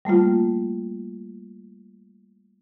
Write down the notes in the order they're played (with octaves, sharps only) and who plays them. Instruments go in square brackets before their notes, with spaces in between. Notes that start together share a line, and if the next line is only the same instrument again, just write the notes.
[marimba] G3 A3 A#3 F4